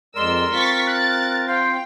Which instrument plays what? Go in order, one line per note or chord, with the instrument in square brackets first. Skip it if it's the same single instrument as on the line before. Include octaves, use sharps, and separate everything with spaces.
[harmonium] F2 G#3 D5 [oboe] A#4 [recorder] C6 [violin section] E6
[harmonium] C4 F4 [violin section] C#6 A6 B6
[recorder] F#6 [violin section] A6
[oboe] C5 [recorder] F5 [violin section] G5